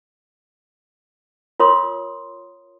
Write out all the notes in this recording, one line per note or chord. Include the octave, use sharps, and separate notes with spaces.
F4 A#4 C#5 C6 D#6